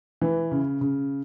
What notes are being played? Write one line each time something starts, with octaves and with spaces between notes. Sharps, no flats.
E3
C#3
C#3